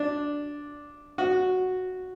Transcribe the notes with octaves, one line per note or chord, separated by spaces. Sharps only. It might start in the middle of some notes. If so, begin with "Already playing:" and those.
Already playing: D4
F#4